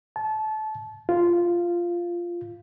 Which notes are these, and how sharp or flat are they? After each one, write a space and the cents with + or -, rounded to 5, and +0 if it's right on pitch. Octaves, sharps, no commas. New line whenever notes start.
A5 -25
F4 -10